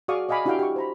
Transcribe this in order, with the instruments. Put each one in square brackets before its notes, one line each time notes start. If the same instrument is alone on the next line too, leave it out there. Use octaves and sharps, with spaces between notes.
[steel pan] F#4 G#4 D5 F5 C#6 D#6
D5 D#5 F5 G#5 B5 D6
D4 E4 F#4 G4 F5 G5
G4 C#6
C5 A#5 B5